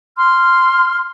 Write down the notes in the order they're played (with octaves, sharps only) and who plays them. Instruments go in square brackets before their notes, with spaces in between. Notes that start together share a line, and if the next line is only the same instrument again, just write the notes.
[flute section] C6 F6